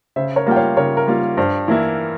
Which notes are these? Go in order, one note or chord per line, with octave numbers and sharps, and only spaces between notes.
C#3 C5 E5
A#4 C#5
G3 A#3 F4 G5
C#5 F5
C#3 A#4 C#5
A#4
G3 A#3 F4
G2 C5
E3 A#3 E4